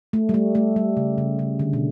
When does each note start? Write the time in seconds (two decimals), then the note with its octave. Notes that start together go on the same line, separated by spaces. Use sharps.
0.13 A3
0.29 G3
0.34 A3
0.55 A3
0.76 G3
0.97 C#3
1.18 C#3
1.39 C#3
1.59 D3
1.73 B2